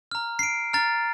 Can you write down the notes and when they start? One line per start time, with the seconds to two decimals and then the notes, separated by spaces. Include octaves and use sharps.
0.11 A#5 F6
0.39 C7
0.43 D7
0.73 A#5 F6 A6